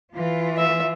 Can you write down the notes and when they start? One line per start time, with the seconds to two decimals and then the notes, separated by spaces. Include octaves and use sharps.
0.13 E3 F4
0.58 E5